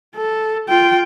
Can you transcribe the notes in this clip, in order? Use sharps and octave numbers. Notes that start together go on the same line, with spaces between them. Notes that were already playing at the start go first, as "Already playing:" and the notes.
A4
F4 G5